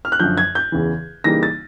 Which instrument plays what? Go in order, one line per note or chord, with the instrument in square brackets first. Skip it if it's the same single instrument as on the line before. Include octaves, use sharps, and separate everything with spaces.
[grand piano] F6
F#6
F#2 D3 F3 G6
G#6
G6
E2 C#3 E3
C#3 E3 G3 A#3 D#4 A#6
A6